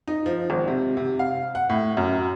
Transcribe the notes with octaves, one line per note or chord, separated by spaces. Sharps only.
D#4
F3
G#1
C3
C3
F5
F#5
A2
F#2